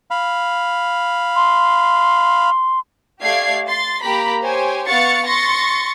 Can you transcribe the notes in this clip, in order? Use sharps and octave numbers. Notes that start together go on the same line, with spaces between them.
F5 B5
C6
A3 G4 D5 F5 G#6 C7
C6 A6
A#3 G4 A#5 B5 B6
G4 C5 C#5 G#5
B3 F5 F#5 C#6 A6 C#7
C6 C#6 A6 A#6 C#7